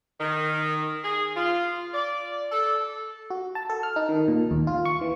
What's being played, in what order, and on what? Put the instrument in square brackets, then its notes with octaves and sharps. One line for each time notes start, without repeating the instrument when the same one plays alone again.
[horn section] D#3
G#4
F4
D5
A4
[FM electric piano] F#4
A5
A4
F6
D#4
D#3
A#2
D#2
F4
C#6
E3